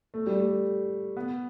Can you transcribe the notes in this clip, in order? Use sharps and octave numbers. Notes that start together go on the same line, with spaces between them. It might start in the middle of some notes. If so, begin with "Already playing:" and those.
A3
G3
A3
B3